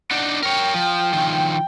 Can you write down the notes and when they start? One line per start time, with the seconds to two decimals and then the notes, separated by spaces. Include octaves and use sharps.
0.11 D4 D#4 F#5
0.43 A#4 C#5 G5
0.74 F3
1.13 D#3 F3